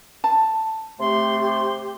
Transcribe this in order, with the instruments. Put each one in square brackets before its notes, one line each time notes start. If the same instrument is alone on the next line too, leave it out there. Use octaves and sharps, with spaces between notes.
[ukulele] A5
[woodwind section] C3 A3 [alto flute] G4 [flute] C6